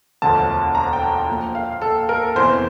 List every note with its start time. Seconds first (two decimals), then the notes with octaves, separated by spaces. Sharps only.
0.22 E1 D2 D3 F3 A5
0.75 A#5
0.93 G5
1.02 A5
1.28 A#1 A#2 F3 G5
1.55 F5
1.82 A4
2.09 A#4
2.35 F1 E2 E3 C5